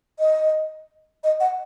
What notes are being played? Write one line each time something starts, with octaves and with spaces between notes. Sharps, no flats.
D#5
D#5
F#5